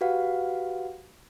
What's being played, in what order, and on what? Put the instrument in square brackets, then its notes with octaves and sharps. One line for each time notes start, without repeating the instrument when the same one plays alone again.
[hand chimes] F#4 G4 B4 F5 F#5